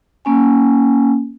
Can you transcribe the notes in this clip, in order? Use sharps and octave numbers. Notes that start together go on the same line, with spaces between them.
A#3 C#4 G#5